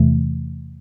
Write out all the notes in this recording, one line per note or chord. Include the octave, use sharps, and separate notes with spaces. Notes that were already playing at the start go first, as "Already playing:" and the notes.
Already playing: E2 C3 E3 A3